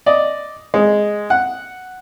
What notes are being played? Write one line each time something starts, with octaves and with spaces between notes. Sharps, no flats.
D5 D#5
G#3
F#5